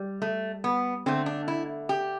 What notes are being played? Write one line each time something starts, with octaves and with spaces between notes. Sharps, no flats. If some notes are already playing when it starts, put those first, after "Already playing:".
Already playing: G3
A3
B3
D3 A3 C4
D4
E4
G4